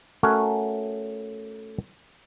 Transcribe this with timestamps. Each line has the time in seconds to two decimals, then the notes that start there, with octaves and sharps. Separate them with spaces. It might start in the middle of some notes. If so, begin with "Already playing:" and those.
0.23 A3 C#4 F#4 A#4 C#5